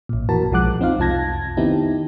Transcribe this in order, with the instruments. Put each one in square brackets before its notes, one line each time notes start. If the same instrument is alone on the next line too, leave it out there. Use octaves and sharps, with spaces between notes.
[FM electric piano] A1 A#2
F2 A#2 E3 F#4 A#4 A5
B1 F3 G#3 F#5 D6 F#6
C4 D#4 F4 F5
C2 F2 F4 A5 G#6 A#6
D#3 B3 C4 D#4 E4 G4